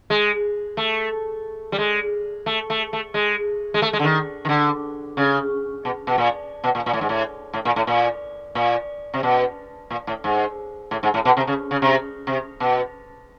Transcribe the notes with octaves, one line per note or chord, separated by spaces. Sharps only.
G#3
A3
G3
G#3
A3
A3
A3
G#3
G#3
A3
G#3
D3
D#3
D#3
D3
C#3
B2
B2
A#2
B2
A#2
A#2
A2
G#2
A2
A2
A#2
A2
A#2
A#2
C3
B2
A#2
A2
G#2
A2
G#2
A2
B2
C3
C#3
C#3
C3
C3
B2